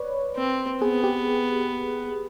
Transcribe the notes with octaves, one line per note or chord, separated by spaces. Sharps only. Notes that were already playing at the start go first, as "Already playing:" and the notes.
Already playing: B4 C#5 D5
C4
B3 G#4
G4